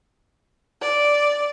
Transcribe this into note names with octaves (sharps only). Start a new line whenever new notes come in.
D5